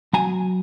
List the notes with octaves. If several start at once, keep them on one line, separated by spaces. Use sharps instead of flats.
F#3 G#5 A#5